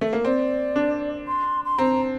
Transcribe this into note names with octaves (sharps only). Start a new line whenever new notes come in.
A3
A#3
C4 D5
D4
C6
C6
C4 A#5